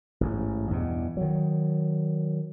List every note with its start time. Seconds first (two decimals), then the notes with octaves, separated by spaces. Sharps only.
0.21 A1 G#2
0.71 E2 G2 B2
1.17 D#3 F#3